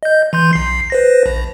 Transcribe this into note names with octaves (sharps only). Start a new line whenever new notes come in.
D#5 G6
E3 C6 G6
B1 C7
B4 C5 A#6
A#1